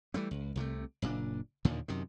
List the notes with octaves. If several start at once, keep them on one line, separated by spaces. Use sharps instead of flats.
E3 G3 A3 B3
C#2
C2 C3 F#3 A3
F#1 A#2 C4 D4
D#2 A#2 D3 D#3
F#2 C3 D#3